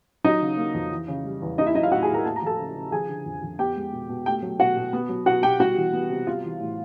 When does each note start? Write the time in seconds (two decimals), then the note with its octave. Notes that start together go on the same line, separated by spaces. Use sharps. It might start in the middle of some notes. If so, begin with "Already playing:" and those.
0.24 F#3 D#4 D#5
0.41 C#3
0.57 A#3
0.74 F2
0.91 E3
1.08 C#3
1.25 G3
1.42 E2
1.58 A#3 D#4 D#5
1.67 E4 E5
1.75 F#3 D#4 D#5
1.83 F4 F5
1.91 A2 F#4 F#5
2.03 G#4 G#5
2.09 A2
2.14 A#4 A#5
2.25 A#3 A5
2.36 A#5
2.42 F3 A4 A5
2.59 C#3
2.75 C#3
2.92 F3 G#4 G#5
3.09 D3
3.26 F2
3.42 F2
3.59 B3 G4 G5
3.76 G#3
3.93 B2
4.09 B2
4.26 A3 G4 G5
4.42 F#3
4.60 B2 F#4 F#5
4.76 B2
4.93 B3
5.09 F#3
5.26 B2 F#4 F#5
5.43 B2 G4 G5
5.60 G3 F#4 F#5
5.77 E3
5.93 B3
6.10 C3
6.27 G3 F4 F5
6.44 E3
6.60 A2